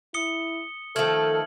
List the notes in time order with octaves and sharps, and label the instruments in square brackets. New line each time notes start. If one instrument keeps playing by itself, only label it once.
[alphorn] E4 [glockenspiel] D#6 C#7 G7
[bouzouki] D#3 F3 A3 [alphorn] A4 [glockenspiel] F6 G#6 F#7